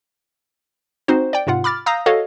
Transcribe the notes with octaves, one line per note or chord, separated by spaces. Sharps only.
C4 D#4 F#4 C5
D5 G5
G#2 C3 F4 F#5
B5 D6 F6 A6
F5 A#5 D#6 E6 G6 A#6
F#4 A4 C#5 D#5 F5